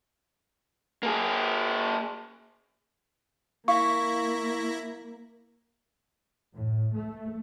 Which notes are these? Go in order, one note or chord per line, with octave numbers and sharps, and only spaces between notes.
A#3 G#4
A#3 E4 E5 F5 C#6 A#6
A2
A3